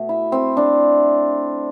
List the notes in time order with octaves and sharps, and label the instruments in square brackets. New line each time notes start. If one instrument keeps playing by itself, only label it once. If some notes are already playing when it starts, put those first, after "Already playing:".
Already playing: [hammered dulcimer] B2 A3
E4
C4
D4